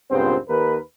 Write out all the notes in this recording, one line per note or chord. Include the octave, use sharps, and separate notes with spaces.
C#2 G2 A#2 B3 C4 C5
D#2 A#4 B4